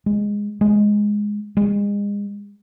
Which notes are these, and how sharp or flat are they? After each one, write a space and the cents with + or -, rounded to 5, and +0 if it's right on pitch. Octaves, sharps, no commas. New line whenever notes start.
G#3 -10
G#3 +0
G#3 -35